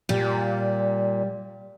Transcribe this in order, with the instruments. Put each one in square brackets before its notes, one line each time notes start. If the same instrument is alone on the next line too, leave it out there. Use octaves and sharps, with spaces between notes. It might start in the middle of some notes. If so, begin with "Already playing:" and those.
[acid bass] A#2 [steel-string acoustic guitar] G3